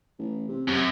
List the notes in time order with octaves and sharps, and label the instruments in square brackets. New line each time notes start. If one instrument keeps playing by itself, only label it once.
[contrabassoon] A1
C3
[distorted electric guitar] F#2 [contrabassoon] C3